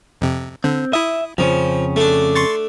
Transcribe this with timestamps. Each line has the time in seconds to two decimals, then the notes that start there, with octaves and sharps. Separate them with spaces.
0.21 F2 C3
0.64 D3 C4
0.93 E4 E5 D#6
1.38 F2 C#3 F3 C#4
1.96 A3 D4
2.35 C6 C#6 A6